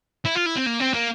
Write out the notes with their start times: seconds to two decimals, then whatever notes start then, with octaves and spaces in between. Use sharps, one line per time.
0.25 E4
0.35 F4
0.46 E4
0.56 C4
0.66 A#3
0.80 C4
0.94 A#3